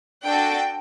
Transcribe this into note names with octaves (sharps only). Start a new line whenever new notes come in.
D4 F#4 A4 G5